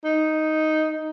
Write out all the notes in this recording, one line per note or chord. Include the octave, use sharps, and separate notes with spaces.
D#4